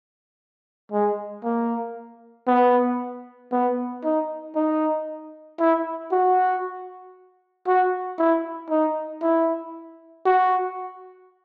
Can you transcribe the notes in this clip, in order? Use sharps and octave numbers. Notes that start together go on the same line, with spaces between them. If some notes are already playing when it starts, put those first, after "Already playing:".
G#3
A#3
B3
B3
D#4
D#4
E4
F#4
F#4
E4
D#4
E4
F#4